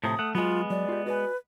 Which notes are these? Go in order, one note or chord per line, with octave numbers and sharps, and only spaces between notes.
A2 C3 F3 D#6
A3 F#5
F#3 G#3 B3 F4
F#3 D5
F4 G4
F#4 B4 D5 G#5